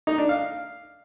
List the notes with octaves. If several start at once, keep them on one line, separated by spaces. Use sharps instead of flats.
D#4
D4
F5